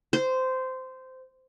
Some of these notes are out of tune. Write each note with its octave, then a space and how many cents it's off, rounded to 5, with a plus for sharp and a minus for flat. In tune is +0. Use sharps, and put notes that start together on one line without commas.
C5 -15